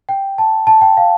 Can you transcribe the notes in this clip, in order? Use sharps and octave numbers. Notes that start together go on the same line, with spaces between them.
G5
A5
A5
G5
F5